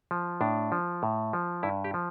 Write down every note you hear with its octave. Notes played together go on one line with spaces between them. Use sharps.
F3
A2 D4
F3
A2
F3
G2 E4
G4
F3